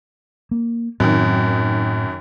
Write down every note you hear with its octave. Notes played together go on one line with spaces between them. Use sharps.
A#3
F#2 A2 D#3 C4